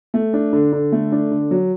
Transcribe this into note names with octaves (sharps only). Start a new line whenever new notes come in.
A3
D4
D3
D3
A3
D4
D3
F#3